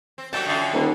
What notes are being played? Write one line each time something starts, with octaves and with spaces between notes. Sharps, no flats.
C4
F#3 G3 F#4 E5 G5 A5
F#2 D3 F4
D#1